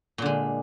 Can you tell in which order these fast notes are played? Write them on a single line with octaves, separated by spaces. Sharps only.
A#2 D3 G#3